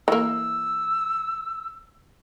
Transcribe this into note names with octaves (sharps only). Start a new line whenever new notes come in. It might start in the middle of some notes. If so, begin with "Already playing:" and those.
E3 A#3 E6